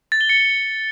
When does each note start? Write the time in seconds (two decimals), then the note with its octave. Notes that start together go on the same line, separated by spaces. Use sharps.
0.12 A6
0.21 G7
0.29 C#7